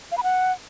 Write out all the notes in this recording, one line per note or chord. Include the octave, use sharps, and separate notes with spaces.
F5
B5
F#5